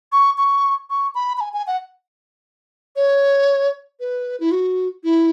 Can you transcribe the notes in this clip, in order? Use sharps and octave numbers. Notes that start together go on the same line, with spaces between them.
C#6
C#6
C#6
B5
B5
G#5
G#5
F#5
C#5
B4
E4
F#4
E4